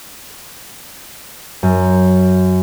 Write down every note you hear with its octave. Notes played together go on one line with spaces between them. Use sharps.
F#2